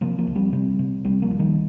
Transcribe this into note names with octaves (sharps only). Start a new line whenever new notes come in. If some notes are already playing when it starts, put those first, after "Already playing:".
C3 F3 A#3
F3 A#3
C2
G3 C4
C3 G3 C4
C3
C2 G3 C4
F3 A#3
C2
D#3 G3